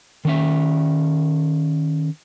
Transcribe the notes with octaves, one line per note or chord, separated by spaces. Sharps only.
D#3 C#4 E5